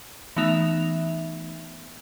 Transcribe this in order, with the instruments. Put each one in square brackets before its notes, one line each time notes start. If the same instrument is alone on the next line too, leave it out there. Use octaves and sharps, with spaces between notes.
[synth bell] E3 A3 B3 D#4 E5 F7